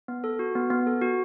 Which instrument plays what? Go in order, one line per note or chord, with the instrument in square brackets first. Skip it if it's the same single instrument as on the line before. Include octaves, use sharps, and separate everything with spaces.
[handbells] B3
A4
F#4
B3
B3
A4
F#4